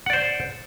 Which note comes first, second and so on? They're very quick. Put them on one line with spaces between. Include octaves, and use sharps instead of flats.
F#5 D5 C5